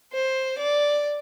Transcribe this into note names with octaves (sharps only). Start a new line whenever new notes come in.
C5
D5